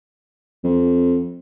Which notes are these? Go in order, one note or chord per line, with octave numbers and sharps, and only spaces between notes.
F2